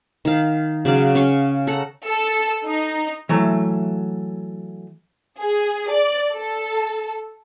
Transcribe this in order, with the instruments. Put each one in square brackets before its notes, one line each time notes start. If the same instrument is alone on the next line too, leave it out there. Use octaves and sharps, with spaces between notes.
[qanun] D#3 F5
C#3 F#3 D5 F5
C#4 F5 C#6
A4 F#5 A#5
[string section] A4
D#4
[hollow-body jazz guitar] E3 F#3 A3
[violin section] G#4
D5
A4